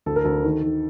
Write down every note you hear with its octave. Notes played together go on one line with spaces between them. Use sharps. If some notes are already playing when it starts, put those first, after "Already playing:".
D2 A4
A#4
D2 A4
D#3
D#3